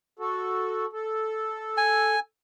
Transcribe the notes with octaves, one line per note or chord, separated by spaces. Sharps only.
F#4 A4
A4
G#5